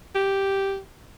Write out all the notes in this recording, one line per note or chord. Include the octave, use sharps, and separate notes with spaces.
G4